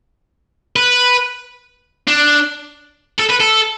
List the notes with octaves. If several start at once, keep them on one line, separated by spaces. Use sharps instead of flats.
B4
D4
A4
B4
A4